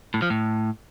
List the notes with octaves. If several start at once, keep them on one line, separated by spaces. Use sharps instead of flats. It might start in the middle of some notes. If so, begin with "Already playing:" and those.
A2
F3
A2